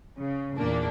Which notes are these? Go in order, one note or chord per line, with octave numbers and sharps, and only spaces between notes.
C#3
E2 A#2 A#3 D4